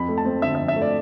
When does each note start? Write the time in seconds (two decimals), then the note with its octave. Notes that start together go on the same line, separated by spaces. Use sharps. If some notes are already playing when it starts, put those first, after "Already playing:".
Already playing: F2 B5
0.09 A3
0.18 A5
0.25 C4
0.42 D3 E5
0.55 F2 E5
0.68 E5
0.76 A3
0.82 D5